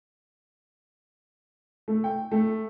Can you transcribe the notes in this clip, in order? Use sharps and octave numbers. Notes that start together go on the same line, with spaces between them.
A3
G5
A3